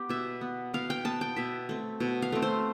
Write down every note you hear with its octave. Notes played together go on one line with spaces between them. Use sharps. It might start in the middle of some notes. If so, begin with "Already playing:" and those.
Already playing: B3 G4
B2 E5
B3
B2 F5
G5
B3 A5
G5
B2 E5
A3 C4
B2
F5
A3 C4
C5